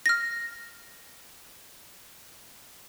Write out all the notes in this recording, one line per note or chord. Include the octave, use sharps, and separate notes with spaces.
F6 A#6